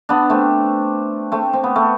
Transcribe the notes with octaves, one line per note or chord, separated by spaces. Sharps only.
B3 D4
A3 C4
A3 C4
C4
B3
A3